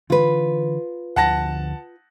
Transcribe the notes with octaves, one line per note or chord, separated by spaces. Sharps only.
D3 E3 F4 B4
D2 D3 F3 F#5 A5 A#6